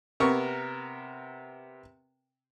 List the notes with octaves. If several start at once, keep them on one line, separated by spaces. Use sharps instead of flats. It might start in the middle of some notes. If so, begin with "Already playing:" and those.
C3 B3 A#4 C#6